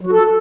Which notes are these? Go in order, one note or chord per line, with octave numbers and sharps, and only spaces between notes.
F#3
F#4
A4